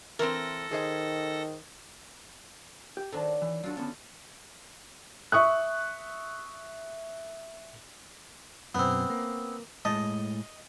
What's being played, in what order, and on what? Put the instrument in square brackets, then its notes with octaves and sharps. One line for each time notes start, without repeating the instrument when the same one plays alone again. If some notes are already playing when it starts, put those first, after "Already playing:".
[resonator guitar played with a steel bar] E3 C4 [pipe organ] A4 A#6 [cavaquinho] A#4 C6
[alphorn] D#3 [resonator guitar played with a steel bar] G#4 C5 D#5
[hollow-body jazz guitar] G4
[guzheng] D#3 F#3 D4 [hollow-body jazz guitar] A4 C5 A5
[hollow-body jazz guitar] E3
[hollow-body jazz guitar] F#3 D4 F#4 [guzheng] F4 A4
[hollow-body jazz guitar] D3 B3 C#4 [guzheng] A4
[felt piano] E5 C#6 D#6 F#6
[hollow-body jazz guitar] F#2 B2 [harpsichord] B3 C4
[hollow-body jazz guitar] A#3
[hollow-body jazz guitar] A2 G#3 A5 [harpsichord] D#5